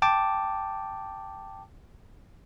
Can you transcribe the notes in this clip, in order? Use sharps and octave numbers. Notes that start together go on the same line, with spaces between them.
G5 A5 D6